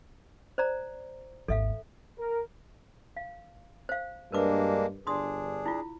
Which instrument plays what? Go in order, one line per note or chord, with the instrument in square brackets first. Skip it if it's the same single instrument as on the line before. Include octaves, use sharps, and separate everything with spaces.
[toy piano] C5 D5 A#5
[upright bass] G#1 D#2 [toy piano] A4 E5 F5
[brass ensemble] A#4
[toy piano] F5
C5 F5
[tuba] G2 [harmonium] G#3 A#3 D4 [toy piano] A#4 B4 D6
[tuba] G1 [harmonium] D4 G#4 [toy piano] C6 D#6
[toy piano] E4 F4